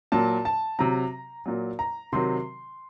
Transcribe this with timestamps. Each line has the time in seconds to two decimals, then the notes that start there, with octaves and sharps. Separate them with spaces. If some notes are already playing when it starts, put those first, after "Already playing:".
0.12 A#2 F#3 A5
0.45 A5
0.79 C3 F#3 A#5
1.46 A#2 F#3
1.79 A#5
2.13 C3 D#3 F#3 C6